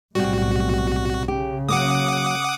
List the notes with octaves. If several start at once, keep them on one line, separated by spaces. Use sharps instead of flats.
B1 A2 C3 G3 F#4
C#3 G4
F#3 A#3 F#5 D6 D#6